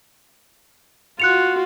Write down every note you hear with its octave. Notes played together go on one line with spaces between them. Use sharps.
F4 F#4 F#6 C#7 F7